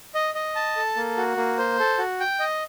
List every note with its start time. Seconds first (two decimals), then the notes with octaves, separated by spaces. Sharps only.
0.15 D#5
0.35 D#5
0.55 A5
0.76 A4
0.96 A#3
1.17 F#4
1.37 A#3
1.58 C5
1.79 A4
1.98 F#4
2.20 G5
2.39 D#5